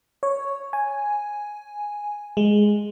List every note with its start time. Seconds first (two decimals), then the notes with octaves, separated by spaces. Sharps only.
0.23 C#5
0.73 G#5
2.37 G#3